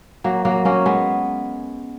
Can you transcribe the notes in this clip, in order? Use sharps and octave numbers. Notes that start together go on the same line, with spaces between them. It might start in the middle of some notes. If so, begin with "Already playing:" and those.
F#3 A#3
F#3 A#3
A#3 C#4
G#3 B3